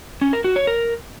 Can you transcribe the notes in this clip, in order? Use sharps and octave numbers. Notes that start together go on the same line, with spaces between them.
C#4
A#4
F#4
C#5
A#4